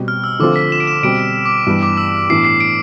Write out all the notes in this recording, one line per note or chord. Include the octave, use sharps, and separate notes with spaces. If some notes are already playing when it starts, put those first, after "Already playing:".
Already playing: B2 G3 C4 G4
F6
E6
D3 F3 A3 C4 F4 D6
B6
E7
D7
E7
B2 G3 C4 D7
D6
G2 E3 G3 B3
D6
E6
A2 E3 B3 D4 C7
C7
D7